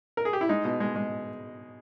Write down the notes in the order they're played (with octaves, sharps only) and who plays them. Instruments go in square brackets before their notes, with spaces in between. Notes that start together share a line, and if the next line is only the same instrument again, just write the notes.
[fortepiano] A#4
G#4
G4
E4
G#3 D#4
B2
G#3
G#3